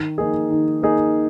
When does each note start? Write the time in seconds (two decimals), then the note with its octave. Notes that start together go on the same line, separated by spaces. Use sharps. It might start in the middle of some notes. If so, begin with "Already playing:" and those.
Already playing: D#3
0.18 A#3 D#4 G#4
0.50 D#3
0.82 A#3 D#4 G#4